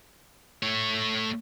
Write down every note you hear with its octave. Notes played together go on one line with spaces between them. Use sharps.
A3 C#5